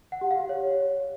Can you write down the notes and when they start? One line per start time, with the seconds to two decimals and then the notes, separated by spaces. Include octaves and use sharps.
0.12 F#5
0.21 G4
0.31 F5
0.40 G4
0.49 C#5